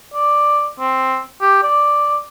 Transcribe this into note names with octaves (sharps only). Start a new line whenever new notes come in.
D5
C4
G4
D5